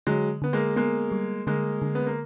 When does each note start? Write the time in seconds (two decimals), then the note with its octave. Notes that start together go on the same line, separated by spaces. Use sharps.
0.07 D3 F#3 G#3
0.42 D3 B3
0.53 G#3 A#3
0.76 G#3 A#3 B3
1.12 G3
1.47 D3 G#3 A#3
1.82 D3
1.95 B3
2.06 A#3